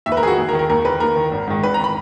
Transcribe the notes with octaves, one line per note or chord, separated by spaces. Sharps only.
D#2 E5
B4
A#4
D#3 G#4
F#4
D#2 G#4
A#4
D#3
A#4
D#2 A#4
D#3 B4
D#2 A#4
D#3
G#1
G#2 D#3
G#1 B4
A#5
D#3 B5